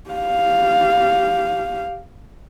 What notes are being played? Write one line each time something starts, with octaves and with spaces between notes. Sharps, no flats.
G4 F5